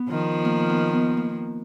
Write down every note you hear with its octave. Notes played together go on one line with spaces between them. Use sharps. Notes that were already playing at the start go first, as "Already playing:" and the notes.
Already playing: B3
D#3 F3
A#3
B3
B3
A#3